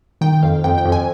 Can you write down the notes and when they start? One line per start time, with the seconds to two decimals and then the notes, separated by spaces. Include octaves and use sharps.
0.21 D#3 G5
0.43 F2 F5
0.64 F2 G5
0.78 G5
0.85 F2
0.92 G#5